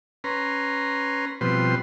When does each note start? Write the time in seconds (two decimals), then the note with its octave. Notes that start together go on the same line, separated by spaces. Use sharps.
0.24 C#4 B4 A#5 C6
1.41 B2 F3 G3 C4 B4 C6